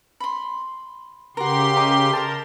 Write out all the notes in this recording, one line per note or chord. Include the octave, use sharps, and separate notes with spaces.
B5 C6
C#3 F#4 G4 A#4 C6
A#4 D#5 D6
A4 A#4 A5 A#5